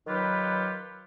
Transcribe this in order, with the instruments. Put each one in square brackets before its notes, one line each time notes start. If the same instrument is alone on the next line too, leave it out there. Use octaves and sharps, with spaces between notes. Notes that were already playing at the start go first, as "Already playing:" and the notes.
[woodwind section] D#3 F#3 D#4 F4 G4 B4